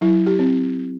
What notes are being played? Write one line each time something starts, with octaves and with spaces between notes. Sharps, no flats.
F#3 E4
G4
C4